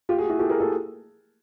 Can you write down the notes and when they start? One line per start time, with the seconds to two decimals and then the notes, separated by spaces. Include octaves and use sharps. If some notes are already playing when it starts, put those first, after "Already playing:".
0.09 F4 G4
0.18 F#4 G#4
0.30 E4 F#4
0.39 G4 A4
0.49 G#4 A#4
0.60 G4 A4